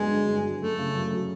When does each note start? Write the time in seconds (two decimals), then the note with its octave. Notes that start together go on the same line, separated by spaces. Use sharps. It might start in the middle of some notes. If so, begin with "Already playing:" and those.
Already playing: G2 D3 F#3 G#3 B3
0.10 D3
0.27 G2
0.44 F#3
0.61 F#2 A3
0.78 C#3
0.95 F#2
1.12 F#3